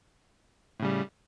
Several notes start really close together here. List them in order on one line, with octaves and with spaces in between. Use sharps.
A2 C#3 G3